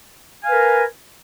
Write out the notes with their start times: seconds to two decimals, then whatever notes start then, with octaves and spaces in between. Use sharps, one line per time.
0.42 G#5
0.45 F5
0.49 B4
0.52 A#4